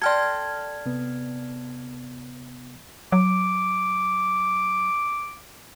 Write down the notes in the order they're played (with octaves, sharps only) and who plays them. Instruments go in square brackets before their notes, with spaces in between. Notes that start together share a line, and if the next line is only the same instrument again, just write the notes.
[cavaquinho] A4 G5 C6 [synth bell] D5 F6 G#6
[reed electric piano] C3 B3
[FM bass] F#3 [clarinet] D6